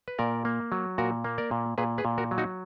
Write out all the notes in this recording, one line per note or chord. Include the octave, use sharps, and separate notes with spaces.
B4
A#2 A#4 D5
A#3
F#3
A#2 F#4 A#4
A#3
A#4 D5
A#2
A#2 G#4 B4
G#4 B4
A#2
F#4 A#4
F#3
D#4 F#4